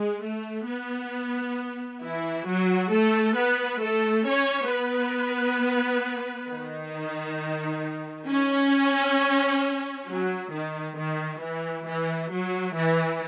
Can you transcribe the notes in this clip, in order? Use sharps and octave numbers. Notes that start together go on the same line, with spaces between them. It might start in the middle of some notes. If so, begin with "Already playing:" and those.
Already playing: G#3
A3
B3
E3 E4
F#3 F#4
A3 A4
B3 B4
A3 A4
C#4 C#5
B3 B4
D#3 D#4
C#4
F#3
D#3
D#3
E3
E3
F#3
E3